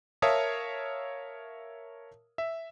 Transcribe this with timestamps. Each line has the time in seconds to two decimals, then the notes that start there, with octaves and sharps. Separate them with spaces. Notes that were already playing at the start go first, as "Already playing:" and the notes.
0.22 A#4 C#5 E5 F5 A5 D#6
2.38 E5